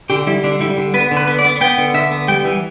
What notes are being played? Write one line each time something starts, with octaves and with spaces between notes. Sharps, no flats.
D3 G4
G3 E4
D3 D4
G3 E4
D3
B3 B4
D3
B4
B3
D5
B3
B3 G5
D3
D3 E5
B3
G3 G5
E3